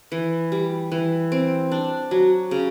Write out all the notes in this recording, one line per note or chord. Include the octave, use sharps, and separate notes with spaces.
E3
G3
E3
C4
D4
F#3
C#3